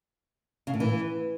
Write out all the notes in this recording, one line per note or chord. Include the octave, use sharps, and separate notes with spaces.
C#3
A2
E3